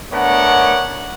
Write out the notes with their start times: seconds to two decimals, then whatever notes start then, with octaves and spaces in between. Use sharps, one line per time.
0.11 A3 B3 D4 A#4 C#5 F#5